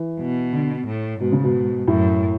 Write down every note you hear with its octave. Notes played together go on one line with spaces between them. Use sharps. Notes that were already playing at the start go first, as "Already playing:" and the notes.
Already playing: E3
B2
D3
A2
G#2 B2
C#3
B2
F#2 A2